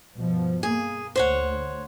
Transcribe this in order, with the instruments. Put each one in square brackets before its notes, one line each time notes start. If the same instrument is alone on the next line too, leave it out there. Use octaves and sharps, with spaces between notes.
[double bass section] G2 B2 F3
[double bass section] A#3 [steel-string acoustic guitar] G#4
[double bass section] D2 [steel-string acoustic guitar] C5 C#5 F#5